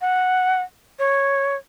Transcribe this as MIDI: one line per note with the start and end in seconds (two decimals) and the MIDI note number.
0.01 0.62 78
0.99 1.55 73